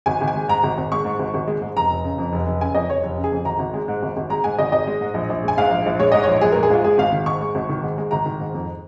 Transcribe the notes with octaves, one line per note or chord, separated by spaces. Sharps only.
G#1 G#5
G#1
G#5
G#3
G#2 A#5
G#1
G#1
G#3 C#6
G#2
G#1
G#1
G#3
G#2
F1 A#5
F1
C#3
F2
F1
F1
C#3 G#5
F2 D#5
F1 C#5
F1
C#3
G#4
F2
G#1 A#5
G#1
G#3
G#2
G#1
G#1
G#3 A#5
G#2 G#5
G#1 D#5
G#1 D#5
G#3
G#2
A#1
A#1
G#3 G#5
G#2 F5
A#1
A#1
G#3 C#5
G#2 D#5
A#1 C#5
A#1 G#4
A#4
G#3
G#4
G#2 F4
G#3 G#4
G#1 F5
D#3
G#2 C#6
G#3
G#1
D#3
G#2
G#3
G#1 A#5
D#3
G#2
F2